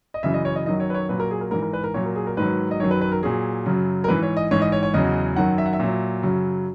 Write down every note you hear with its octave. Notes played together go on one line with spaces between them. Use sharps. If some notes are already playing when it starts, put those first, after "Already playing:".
D#5
F#2 C#3 E3 E5
D#5
C#5
D#5
F#2 D#3 F#3 D#5
C#5
B4
C#5
A#2 F#3 B4
A#4
G#4
A#4
G#2 E3 A#4
A#4
B4
A#4
A#2 F#3 C#5
A#4
G#4
A#4
G#2 D#3 F#3 B4
D#5
F#2 D#3 F#3 C#5
B4
B4
A#4
A#2 F#3 G#4
F#2 C#3 F#3
A#4
G#2 E3 B4
C#5
D#5
G#2 E3 C#5
D#5
C#5
C#5
E2 C#3 F#3 D#5
F#2 D#3 F#3 F#5
E5
F#5
E5
A#2 F#3
F#2 C#3 F#3